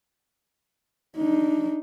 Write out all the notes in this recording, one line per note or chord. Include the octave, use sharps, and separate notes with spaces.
D4 D#4